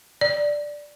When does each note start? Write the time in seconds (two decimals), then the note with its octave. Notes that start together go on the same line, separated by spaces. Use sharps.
0.21 D5